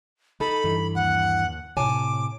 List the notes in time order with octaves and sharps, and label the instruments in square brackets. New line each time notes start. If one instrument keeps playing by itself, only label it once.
[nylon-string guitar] D#4 A4 [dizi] B5
[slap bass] G2 E3
[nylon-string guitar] D#2 [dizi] F#5
[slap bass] A2 C3 [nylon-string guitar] C#5 G#5 A5 [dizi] D6